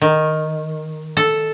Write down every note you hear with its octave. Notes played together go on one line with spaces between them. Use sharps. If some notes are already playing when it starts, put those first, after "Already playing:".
D#3
A4